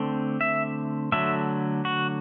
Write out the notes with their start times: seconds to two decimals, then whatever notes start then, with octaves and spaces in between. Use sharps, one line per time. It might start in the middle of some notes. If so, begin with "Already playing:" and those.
Already playing: D3 A3 C4
0.41 E5
1.12 D3 F#3 A3 E5
1.85 F#4